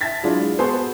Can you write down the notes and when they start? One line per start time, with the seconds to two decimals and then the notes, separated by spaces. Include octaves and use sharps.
0.01 E5 A5 G#6 A6 B6
0.23 F#3 G#3 D4 E4 F4 G#4
0.59 B3 F#4 G#4 A4 C5 G#5